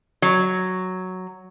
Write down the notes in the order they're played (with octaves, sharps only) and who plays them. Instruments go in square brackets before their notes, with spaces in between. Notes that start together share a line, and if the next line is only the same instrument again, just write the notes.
[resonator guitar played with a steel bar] F#3